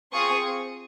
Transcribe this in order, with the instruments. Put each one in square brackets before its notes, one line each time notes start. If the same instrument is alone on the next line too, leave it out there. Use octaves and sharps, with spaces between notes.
[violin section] C4 F4 G#4 C#6 D#6